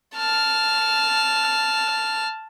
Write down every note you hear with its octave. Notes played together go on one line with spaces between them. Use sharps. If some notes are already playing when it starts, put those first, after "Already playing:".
A5 F6